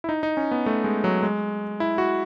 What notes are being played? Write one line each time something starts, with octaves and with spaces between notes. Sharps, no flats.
E4
D#4
D#4
C#4
B3
A3
G#3
F#3
G#3
E4
F#4